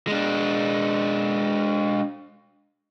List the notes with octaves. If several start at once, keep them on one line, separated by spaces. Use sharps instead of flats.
G#3 D4